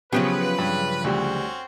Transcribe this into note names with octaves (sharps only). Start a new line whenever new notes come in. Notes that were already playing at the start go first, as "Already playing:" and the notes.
C#3 F3 F#3 B3 C#4 G4 B4
G2
D2 G3 C4 C#4 F#4